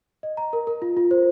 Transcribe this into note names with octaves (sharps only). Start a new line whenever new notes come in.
D#5
A#5
A#4
A#4
F4
F4
C5